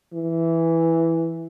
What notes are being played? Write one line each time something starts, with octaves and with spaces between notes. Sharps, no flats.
E3